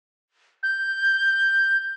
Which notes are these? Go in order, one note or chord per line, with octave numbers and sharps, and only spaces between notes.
G6